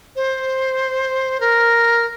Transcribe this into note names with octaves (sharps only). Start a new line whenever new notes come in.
C5
A#4